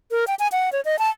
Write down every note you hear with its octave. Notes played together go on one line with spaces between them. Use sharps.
A#4
G5
G#5
F#5
C#5
D#5
A5